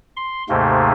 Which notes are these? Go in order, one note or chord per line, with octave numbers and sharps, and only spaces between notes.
C6
D#2 G#2 C3 A3 A#3